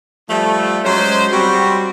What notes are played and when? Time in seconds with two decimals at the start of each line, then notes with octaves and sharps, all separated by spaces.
0.28 F3 G3 A3
0.83 F#3 G#3 C#4 C5
1.32 G3 C4 F#4